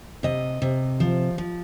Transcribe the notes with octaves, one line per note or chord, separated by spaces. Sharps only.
C3 D#5
C3
F3
F3